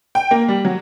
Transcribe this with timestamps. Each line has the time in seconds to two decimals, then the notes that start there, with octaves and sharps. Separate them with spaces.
0.15 G5
0.31 A#3
0.48 G3
0.65 F#3